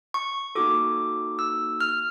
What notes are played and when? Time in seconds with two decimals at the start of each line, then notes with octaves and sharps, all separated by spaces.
0.14 C#6
0.55 A#3 D#4 F#4 A4 D6
1.39 E6
1.81 F6